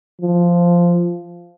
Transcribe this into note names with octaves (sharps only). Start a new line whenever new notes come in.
F3